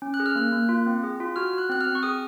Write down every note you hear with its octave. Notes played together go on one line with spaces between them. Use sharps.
C#4
F#6
G#4
F6
A#3 F#6
A#3
F4
C4
G#4
F4
F#4 F6
F#4 F#6
C4 F#6
F6
C4
C#6
G#4 D#6